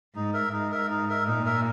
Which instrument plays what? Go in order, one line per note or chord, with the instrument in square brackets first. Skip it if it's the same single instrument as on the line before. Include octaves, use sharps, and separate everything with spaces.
[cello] G#2 [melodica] D#4
[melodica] A#4 E5
[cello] G#2 [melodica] D#4
[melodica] A#4 E5
D#4
A#4 E5
[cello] A#2 [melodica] D#4
[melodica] A#4 E5